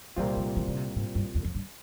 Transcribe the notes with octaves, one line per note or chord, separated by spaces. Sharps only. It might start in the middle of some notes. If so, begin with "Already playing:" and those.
C2 A#2 E3 G3 C4 F4
F3
E3
C#3
C3
G#2
G2
E2
F2
G2